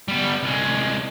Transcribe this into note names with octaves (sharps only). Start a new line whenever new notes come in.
G3 B3
C2 G#3